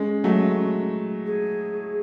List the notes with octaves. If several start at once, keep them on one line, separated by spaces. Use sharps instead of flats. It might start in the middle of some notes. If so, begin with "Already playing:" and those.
Already playing: G#3 C#4
F#3 A3
G#4